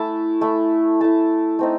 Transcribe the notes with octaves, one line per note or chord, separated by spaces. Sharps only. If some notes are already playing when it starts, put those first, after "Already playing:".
Already playing: A3 E4 A5
A3 E4
A3 E4 A5
A3 C4 D#4